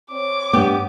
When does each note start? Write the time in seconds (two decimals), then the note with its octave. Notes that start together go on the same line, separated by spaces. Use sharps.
0.11 C4 C#5 D6
0.53 G2 B3 G4 G5